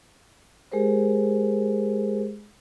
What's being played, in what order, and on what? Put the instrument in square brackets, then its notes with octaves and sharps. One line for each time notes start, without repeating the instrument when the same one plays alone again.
[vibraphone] G#3 G4 G#4 A#4 C5